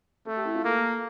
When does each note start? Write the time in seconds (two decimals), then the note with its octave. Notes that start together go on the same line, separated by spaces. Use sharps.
0.26 A3 A4
0.36 G4
0.45 E4
0.55 F4
0.64 A#3 A4